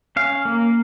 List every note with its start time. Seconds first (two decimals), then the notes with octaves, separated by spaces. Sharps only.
0.16 C#4 F5
0.45 A#3